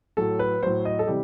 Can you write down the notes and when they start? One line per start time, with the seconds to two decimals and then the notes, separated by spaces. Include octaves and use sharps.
0.17 A2 F#3 A4
0.39 B4
0.63 A2 F#3 C5
0.85 D#5
0.99 A4
1.07 C3 E3 G3 G4